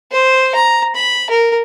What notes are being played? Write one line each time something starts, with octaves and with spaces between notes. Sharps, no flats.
C5
A#5
B5
A#4